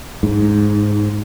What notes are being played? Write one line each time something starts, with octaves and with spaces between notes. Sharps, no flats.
G#2